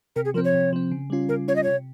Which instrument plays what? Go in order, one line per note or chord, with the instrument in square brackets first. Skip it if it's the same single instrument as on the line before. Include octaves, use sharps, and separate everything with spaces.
[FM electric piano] C3 [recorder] A#4
[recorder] G#4
[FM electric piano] F3 [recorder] A#4
[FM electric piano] C4
[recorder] C#5
[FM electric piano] C3
F3 C4
C#3
G3 C#4 F4
[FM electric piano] C#3 [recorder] A#4
[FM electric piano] G3 C#4 F4 [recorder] C#5
[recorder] D#5
[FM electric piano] C3 [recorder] C#5